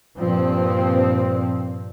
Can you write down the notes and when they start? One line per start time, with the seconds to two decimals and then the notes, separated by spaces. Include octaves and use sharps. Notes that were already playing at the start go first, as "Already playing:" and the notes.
0.17 G2 A#2 F3 C4